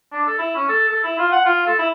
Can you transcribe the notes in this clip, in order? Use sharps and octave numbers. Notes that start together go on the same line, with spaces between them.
D4
A4
E4
C#4
A4
A4
E4
F4
F#5
F4
A4
E4